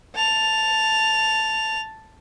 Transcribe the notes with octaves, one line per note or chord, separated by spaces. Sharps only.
A5 F7